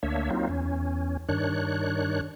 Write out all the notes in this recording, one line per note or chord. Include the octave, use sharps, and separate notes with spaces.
D2 A#3 D4 C#5 E5
F#3 A#3 C4 D#4 F4
E2 C#4
G2 D#3 D4 C#5 F#6